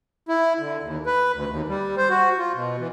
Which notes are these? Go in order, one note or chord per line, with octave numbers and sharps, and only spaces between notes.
E4
D3
D#2
B4
D2
D#2
G3
C5
F#4
F4
B2
E3